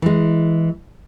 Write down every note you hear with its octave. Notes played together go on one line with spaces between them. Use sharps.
E3 G#3